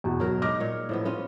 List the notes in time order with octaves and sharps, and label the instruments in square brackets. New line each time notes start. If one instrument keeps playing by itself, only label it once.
[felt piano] E2 B2
[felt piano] B2 [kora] F#3 A#4
[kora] G#3 D#4 [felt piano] D6 F6 A#6
[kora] A#2 C#5
A2 F3 B3
B3 C#4 F4